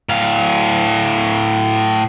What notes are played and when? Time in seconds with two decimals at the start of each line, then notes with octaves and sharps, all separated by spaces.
0.09 A2 F5